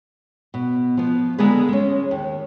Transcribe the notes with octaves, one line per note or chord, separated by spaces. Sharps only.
B2
F3 B3
D3 G#3 A#3 B3 G#4 B4
G#3 C#4
D#2